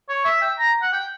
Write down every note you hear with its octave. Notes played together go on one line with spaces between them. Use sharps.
C#5
E5
G5
A#5
F#5
G5